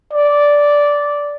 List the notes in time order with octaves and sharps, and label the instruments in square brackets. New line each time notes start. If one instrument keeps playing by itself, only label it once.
[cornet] D5